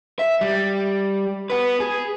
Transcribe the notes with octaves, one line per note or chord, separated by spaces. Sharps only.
E5
G3
B3 B4
G#4